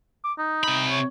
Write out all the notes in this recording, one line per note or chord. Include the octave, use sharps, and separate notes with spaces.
D6
D#4
C3 B5
C#5